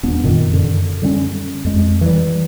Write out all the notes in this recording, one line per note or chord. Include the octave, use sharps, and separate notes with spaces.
D#1 B3 D4
F#2 A#2 D#3
F#2 D3
D3 G3 B3 C#4
F2 G#3
E3 G3